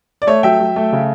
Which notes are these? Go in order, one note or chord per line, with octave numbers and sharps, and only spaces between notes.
D5
A3 C#5
F#3 E5 G5
F#3
A3
C#3